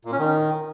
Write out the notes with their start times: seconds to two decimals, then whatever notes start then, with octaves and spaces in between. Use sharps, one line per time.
0.05 A#2
0.12 C#4
0.19 D#3